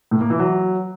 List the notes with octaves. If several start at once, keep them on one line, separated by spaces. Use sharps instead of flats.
A2
A#3
E3
F#3